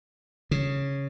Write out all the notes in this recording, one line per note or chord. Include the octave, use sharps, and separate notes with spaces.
C#3